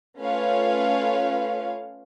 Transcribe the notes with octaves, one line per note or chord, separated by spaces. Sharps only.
A3 C#4 F4 B4 C#5 F5